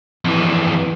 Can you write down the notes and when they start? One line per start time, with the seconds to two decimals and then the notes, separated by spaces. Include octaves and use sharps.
0.25 F2 E3